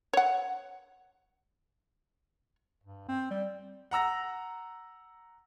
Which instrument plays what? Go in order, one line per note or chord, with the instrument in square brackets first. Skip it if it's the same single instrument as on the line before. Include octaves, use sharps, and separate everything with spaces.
[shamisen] C#5 F#5
[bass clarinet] G2
C4
G3
[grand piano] F#5 A#5 E6 A#6